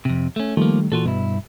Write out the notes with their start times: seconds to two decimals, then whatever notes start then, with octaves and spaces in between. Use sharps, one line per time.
0.05 F2 C3
0.36 A3 C#4
0.57 D#3 F3 G3 A3 A#3
0.92 A#2 E3 F4 F#4 A4
1.06 G2 B2 E4